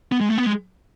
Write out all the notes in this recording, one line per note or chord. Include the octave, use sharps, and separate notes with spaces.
B3
G#3
A3
B3
G#3